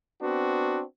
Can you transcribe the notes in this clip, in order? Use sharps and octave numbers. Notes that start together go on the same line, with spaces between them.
B3 C4 D4 F#4